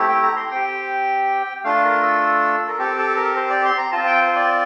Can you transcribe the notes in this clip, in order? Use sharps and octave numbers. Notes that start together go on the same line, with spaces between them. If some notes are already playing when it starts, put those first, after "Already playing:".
Already playing: A3 C4 E4 G4
G5
A#5
C6
C4 G4 G5
A3 D4 F4 F5
A#4
A4
A#4
C4 G4 A4
A4
A#4
C5
D5
C6
A#5
C4 F4 A5
G5
C5
D5